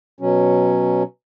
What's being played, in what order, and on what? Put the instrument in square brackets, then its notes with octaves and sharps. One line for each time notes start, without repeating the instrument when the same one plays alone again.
[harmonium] B2 F#3 C#4